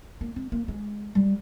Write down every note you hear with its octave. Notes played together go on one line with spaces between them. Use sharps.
A#3
C4
A#3
G#3
G3